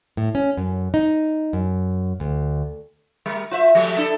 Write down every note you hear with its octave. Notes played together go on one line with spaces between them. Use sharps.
A2
C#4
F#2
D#4
F#2
D2
G3 A#4
F4 C5 E5
F3 G3 A3
D4 E4 A4